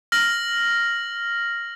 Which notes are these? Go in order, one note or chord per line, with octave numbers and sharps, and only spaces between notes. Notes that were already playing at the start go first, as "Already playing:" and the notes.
F6 A#6 F#7